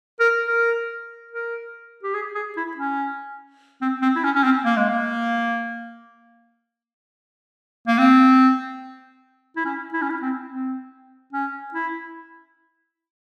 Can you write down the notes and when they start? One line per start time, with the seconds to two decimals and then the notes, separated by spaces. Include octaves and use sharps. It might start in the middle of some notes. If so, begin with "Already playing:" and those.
0.20 A#4
0.47 A#4
1.31 A#4
2.03 G4
2.14 G#4
2.35 G#4
2.57 E4
2.77 C#4
3.81 C4
4.02 C4
4.16 E4
4.24 C#4
4.35 C#4
4.44 C4
4.65 A#3
4.77 G#3
4.89 A#3
7.87 A#3
7.98 C4
9.56 E4
9.65 C#4
9.93 E4
10.02 C#4
10.10 E4
10.21 C4
10.49 C4
11.33 C#4
11.74 E4